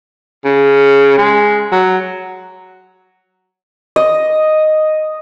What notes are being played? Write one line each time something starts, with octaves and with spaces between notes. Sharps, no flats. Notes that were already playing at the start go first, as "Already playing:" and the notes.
C#3
G#3
F#3
D#5